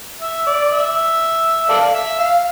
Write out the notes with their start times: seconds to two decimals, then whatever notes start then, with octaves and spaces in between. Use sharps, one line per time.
0.22 E5
0.47 D5
0.72 E5
1.69 A4 D5 F5
1.94 E5
2.19 F5